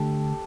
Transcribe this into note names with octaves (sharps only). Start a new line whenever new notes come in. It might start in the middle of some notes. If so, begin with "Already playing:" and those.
Already playing: D3 A3 D4 G4 A4